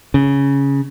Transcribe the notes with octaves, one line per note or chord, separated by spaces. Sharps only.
C#3